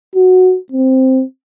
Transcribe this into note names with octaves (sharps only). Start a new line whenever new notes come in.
F#4
C4